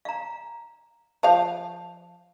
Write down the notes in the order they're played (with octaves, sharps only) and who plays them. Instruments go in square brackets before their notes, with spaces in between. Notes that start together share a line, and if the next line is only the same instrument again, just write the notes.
[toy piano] F5 A#5
[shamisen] F3 F5 [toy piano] A5